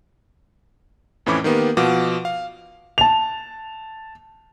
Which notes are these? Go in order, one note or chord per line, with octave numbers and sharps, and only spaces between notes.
F2 A2 E3 C#4 B5 D6
D#3 A#3 B3 G4
B2 F3 F5 F#5 D6
F5
A5 F7